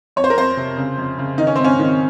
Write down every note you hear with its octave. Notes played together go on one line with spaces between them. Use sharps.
F2 C#5
C5
A#4
F2 C5
C3
C#3
F2
C#3
D#3 D#4
C#4
G#2 C4
C#4
D#3